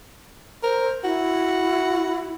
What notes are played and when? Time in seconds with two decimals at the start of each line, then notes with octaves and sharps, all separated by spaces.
0.63 A#4 C5
1.04 E4 F#4